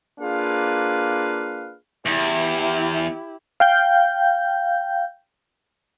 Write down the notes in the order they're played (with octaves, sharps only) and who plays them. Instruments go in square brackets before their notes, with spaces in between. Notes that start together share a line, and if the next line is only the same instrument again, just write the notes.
[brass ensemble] A#3 D4 F4 G#4 B4 F5
[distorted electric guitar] E2 [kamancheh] E4 G4
[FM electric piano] F5 G5 G6